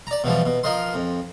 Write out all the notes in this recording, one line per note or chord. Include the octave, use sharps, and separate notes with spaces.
D5 A#5
B2 E3 F3 G3
B2
F3 A#4 D#5 C6
F2